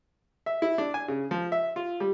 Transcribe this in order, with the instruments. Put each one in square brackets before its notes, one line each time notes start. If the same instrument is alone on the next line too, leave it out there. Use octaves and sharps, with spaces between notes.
[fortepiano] E5
E4
D4
G#5
C#3
F3
E5
F4
G3